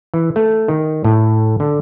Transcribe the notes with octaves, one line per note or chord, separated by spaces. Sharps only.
E3
A3
D#3
A2
D3